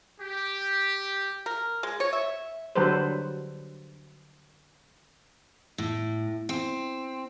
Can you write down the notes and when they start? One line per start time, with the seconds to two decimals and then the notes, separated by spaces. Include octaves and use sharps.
0.20 G4
1.46 A#4
1.83 G#3
2.00 C#5
2.13 E5
2.76 D3 F#3 G3 A4 B4 C5
5.78 A2
6.49 C4